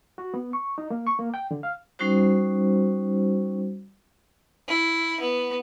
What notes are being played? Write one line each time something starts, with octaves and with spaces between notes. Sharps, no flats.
F#4
B3
C#6
D#4
A#3
C#6
A#3
G5
D3
F5
G3 C#4 D#4 F#4 C5
E4
B3